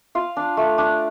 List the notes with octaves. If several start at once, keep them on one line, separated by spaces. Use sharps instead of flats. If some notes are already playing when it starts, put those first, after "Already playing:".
F4 F5
D4
A3
D4